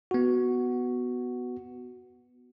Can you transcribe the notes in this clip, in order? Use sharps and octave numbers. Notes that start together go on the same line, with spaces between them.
B3 F#4